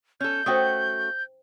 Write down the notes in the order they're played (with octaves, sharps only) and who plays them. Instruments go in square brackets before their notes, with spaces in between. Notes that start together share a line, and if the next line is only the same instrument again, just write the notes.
[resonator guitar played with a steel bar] C#4 A4 [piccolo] G6
[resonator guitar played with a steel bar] A3 C#4 F#4 [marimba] C5 G5 D#6